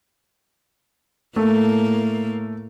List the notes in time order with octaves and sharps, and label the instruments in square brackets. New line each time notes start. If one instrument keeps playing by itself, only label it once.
[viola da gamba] A2 A#3 [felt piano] A3